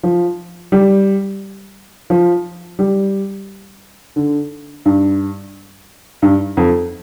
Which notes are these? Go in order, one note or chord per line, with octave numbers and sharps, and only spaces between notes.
F3
G3
F3
G3
D3
G2
G2
F2